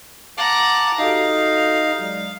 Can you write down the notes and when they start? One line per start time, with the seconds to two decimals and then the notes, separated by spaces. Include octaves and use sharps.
0.38 F#5 A5 A#5 D6
0.98 D#4 F#4 G4 A4 F5
1.98 F#3 G#3 D5